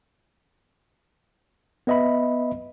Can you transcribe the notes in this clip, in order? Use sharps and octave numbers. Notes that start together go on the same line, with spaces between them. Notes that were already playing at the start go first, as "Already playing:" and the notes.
B3 B4 D#5 E5 B5